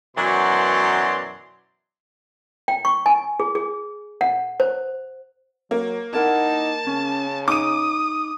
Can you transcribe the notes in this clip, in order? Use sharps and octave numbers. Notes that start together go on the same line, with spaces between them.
F#2 B2 E3 F#3 D5 C6
G5
C#6
G#5
G#4
G#4
F#5
C5
F#3 A#3
D#4 E4 A#4 F#5 A5
C#3 C#4
D#4 D6 D#6 D#7